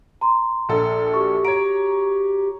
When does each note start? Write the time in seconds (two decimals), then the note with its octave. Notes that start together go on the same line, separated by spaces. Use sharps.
0.21 A#5 C6
0.69 A#1 A4
1.14 F#4 G4 C#6
1.45 C#5 A#5 D7